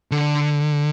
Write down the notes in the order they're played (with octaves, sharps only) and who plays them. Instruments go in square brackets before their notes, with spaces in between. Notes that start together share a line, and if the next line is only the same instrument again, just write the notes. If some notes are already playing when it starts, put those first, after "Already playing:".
[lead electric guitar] D3